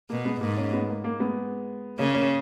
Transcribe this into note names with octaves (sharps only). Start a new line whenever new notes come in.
B2 A#3
G#3 B3
G#2 A#3
A#3 C#4
G#3 B3
A#3
A#3
G#3 B3
C#3 A#3 C#4
A#3 C#4